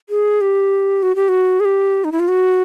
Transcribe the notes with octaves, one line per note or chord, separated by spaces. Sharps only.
G#4
G4
F#4
G4
F#4
G#4
G4
D#4
E4
F4
F#4